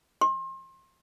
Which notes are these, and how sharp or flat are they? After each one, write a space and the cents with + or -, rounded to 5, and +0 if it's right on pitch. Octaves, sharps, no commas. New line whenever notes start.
C6 +35